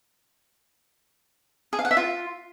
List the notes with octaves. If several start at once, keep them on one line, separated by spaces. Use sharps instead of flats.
G#4
F5
F#5
E5
F4